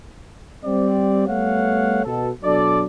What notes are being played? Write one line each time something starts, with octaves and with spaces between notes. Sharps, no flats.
G3 C4 D5
G3 A3 B3 C#5 F5 F#5
B2 A4
B2 F#3 D4 A4 D5